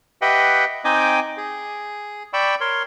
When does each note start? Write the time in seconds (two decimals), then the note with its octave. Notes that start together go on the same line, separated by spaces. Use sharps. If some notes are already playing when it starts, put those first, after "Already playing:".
0.22 G4 B4 D#5 E5 F#5 G5
0.85 C4 D#4 D#5 G5 G#5 D6
1.37 G#4
2.33 D5 G5 B5 C#6 E6
2.61 A#4 C#5 C6